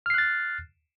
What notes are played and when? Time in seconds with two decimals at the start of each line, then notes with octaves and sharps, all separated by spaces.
0.06 F6
0.10 C7
0.14 F#6
0.18 A6